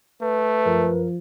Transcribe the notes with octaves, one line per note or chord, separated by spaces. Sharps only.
A3 B4
F#2 F3 A#4